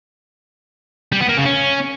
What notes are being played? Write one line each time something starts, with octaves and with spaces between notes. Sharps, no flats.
G3
B3
A#3
C#3
C#4